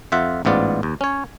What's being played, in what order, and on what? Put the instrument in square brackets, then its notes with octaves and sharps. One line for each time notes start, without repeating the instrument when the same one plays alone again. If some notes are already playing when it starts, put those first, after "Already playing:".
[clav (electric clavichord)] F2 F4 E5 F#5
A1 G#2 B3 F4 D5
D#2
C#4 C#5